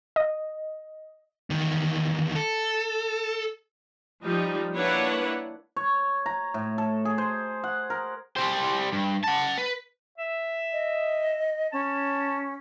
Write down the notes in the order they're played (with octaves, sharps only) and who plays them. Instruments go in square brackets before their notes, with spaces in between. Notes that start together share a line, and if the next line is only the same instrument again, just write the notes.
[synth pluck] D#5
[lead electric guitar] E2 D#3
A4
[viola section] F3 G3 D#4
A#3 D4 E4 B4 C#5 F#5
[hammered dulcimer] C#5
A#5
A2
A4
G#4
C5
F#5
A#4
[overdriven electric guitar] G3 C5
G2
F#5 A5
B4
[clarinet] E5
[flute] D#5
[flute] C#4 [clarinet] A5